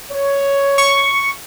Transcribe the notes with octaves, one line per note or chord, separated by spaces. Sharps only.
C#5
C#6